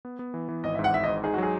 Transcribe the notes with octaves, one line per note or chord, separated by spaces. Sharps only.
B3
B3
E3
E3
G#1 D#5
E5
G#2
F#5
G#1 E5
D#5
G#2
D#4 G#4
F#4
F#3 G#4